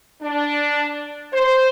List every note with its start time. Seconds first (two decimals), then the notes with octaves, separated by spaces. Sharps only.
0.22 D4
1.33 C5